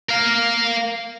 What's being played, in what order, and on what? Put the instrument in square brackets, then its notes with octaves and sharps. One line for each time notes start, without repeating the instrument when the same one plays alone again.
[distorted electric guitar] A#4 F5